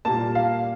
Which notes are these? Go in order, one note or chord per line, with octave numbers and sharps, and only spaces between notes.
A#2 G3 A#3 A5
F5